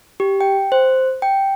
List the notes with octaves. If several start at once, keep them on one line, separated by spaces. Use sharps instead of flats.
G4
G5
C5
G5